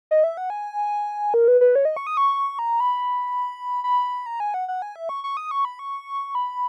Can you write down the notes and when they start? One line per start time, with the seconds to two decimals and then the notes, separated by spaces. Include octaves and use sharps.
0.11 D#5
0.24 E5
0.37 F#5
0.50 G#5
1.34 A#4
1.48 B4
1.61 B4
1.75 C#5
1.85 D#5
1.97 C#6
2.07 D#6
2.17 C#6
2.59 A#5
2.80 B5
3.84 B5
4.26 A#5
4.40 G#5
4.54 F#5
4.68 F#5
4.82 G#5
4.96 E5
5.09 C#6
5.24 C#6
5.37 D#6
5.51 C#6
5.65 B5
5.79 C#6
6.35 B5